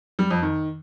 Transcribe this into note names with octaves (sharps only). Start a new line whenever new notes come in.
G3
F2
D#3